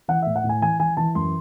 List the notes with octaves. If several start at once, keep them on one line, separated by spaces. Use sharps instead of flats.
E3 F#5
A2 E5
F#5
A2
G#5
E3 G#5
E3 G#5
E3 A5
F#2 C6